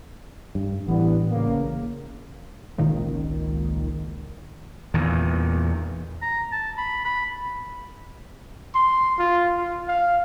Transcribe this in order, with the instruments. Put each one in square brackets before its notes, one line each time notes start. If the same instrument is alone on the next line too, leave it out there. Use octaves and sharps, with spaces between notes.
[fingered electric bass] G2
[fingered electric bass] A1 [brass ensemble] E3 G3 B3
[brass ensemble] C#3 A#3
[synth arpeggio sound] G#1 C#2 A#2 D#3
[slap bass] E2 A#2 D#3
[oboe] A#5
A5
B5
B5
[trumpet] C6
F4
F4
F5